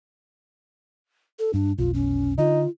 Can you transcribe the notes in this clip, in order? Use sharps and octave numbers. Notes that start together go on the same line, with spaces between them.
A4
G2 D4
F1 B1 F4
C#4
D3 D#4 F4